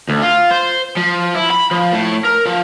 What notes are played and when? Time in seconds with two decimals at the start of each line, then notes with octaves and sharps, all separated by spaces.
0.09 D2
0.22 F4
0.51 C5
0.97 F3
1.35 E4
1.51 B5
1.71 F3
1.92 A2
2.25 A#4
2.46 F3